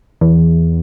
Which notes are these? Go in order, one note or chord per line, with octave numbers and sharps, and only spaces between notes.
E2